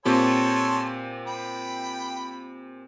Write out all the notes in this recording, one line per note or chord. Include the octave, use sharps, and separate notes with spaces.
A#2 C4 G4 A4 C#5 C6
G5 B5